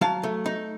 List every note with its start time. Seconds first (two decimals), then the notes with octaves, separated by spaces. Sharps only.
0.01 F#3 F5 A5
0.23 A3
0.46 D#4